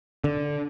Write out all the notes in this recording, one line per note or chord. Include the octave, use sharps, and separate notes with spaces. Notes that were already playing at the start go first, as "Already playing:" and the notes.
D3